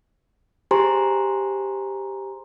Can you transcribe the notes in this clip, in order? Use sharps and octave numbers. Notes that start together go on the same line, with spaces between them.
G4 G#4 C5 G#5 A#5 C6